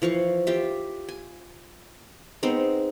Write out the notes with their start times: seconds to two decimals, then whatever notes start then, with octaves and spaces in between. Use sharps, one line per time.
0.02 E3 F3 F5 C#6
0.47 F4 G4 E5
1.09 G#5
2.43 G#3 B3 C4 D#4